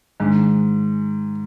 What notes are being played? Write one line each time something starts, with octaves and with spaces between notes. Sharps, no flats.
G#2 D#3 G#3 D4